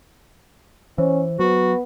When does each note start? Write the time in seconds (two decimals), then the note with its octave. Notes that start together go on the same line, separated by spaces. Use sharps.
0.98 E3 C#4 C5
1.39 F#3 B3 F#4